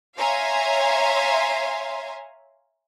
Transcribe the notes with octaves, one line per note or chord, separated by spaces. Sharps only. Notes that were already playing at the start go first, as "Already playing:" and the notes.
C#5 E5 F5 G#5 A#5 C6